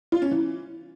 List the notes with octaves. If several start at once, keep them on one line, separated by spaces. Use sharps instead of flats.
F4
C#4
E3